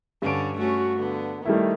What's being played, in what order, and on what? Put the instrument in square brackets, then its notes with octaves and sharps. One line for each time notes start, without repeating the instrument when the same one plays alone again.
[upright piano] G2 D7 [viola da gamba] D3 C#4
[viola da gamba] A3 C#4 [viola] F#4
[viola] D3 [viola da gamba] B3
[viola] D#3 [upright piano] G3 A3 E4